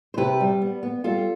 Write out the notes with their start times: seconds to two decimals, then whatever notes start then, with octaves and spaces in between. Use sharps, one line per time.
0.14 C5
0.17 C3 G4 B4
0.40 G3
0.62 B3
0.83 B3
1.04 G3 F4 A4